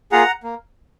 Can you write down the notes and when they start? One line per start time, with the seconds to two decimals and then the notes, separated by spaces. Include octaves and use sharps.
0.12 A#3 F4 G#4 F#5 A#5
0.43 A#3